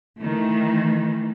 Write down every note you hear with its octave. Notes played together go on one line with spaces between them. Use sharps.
D#3 E3 A3